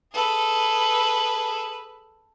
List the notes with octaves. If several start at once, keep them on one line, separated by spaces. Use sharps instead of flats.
G#4 A4 B4